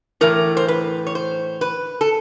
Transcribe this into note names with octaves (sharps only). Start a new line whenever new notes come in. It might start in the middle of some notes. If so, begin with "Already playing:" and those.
A2 E3 A#4
C5
B4
C#5
C5
B4
A4